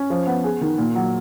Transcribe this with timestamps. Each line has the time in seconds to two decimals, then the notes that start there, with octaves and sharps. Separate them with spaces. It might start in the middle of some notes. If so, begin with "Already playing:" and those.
Already playing: C#4
0.10 F3
0.27 B3
0.44 G#4
0.61 D#3
0.78 A#2
0.95 F#3